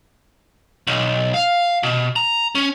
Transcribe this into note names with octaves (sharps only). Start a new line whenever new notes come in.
B1
F5
B2
A#5
C#4